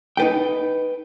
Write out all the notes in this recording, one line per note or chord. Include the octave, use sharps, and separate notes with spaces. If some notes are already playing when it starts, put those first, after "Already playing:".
D#4 B4 G5